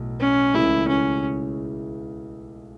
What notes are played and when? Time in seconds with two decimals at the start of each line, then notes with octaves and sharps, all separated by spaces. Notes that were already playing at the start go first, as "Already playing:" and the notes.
Already playing: B1 A2
0.20 C#4
0.54 C#2 C#3 E3 A3 E4
0.88 C#4